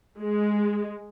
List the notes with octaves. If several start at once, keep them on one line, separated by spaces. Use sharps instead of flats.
G#3